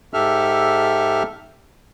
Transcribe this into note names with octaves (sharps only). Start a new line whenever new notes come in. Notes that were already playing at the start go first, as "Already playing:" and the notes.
G#2 G4 A4 E5 F6